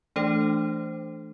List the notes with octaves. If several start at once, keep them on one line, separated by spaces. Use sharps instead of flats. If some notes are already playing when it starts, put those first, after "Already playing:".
E3 A3 D4 A4 C5